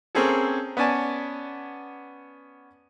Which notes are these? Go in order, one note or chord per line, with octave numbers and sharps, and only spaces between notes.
A#3 C4 C#4 G#4 A4
B3 C#4 D5 G#5 A5